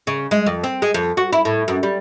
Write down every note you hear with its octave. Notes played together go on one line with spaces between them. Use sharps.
C#3
G#3
F2
C4
G#3
F2
F#4
E4
A2
F#2
G3